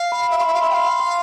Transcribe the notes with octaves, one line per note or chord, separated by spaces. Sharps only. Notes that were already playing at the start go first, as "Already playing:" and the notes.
Already playing: F5
B5
E5
F5
C6
E5
F5 B5
E5 C6
G5
F5
C6